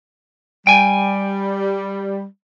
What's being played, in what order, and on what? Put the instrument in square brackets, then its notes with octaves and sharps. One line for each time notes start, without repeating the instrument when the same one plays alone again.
[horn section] G3 [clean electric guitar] G5 G#5